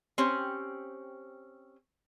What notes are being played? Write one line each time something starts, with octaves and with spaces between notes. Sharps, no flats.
C4 C#4 G4